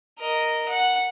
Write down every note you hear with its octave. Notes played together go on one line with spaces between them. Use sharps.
A#4 D#5
F#5